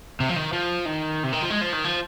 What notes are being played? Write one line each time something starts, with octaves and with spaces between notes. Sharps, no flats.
C3
F3
D#3
F3
D#3
C3
D#3
F3
G#3
F3
D#3
F3